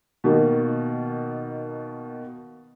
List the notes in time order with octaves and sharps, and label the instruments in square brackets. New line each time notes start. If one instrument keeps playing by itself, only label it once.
[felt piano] B2 D#3 A#3